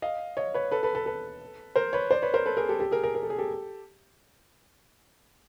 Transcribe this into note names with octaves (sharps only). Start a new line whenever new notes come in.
D#5 F5
C#5 D#5
B4 C#5
A4 B4
A4 B4
A4 B4
A4 B4
A#4 C5
B4 C#5
C5 D5
B4 C#5
A#4 C5
A4 B4
G#4 A#4
G4 A4
G4 A4
G#4 A#4
G#4 A#4
A#4
A4
G#4
G4 A4